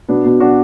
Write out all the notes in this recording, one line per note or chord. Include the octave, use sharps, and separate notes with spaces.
B2 B3 D4
B2
D4 F#4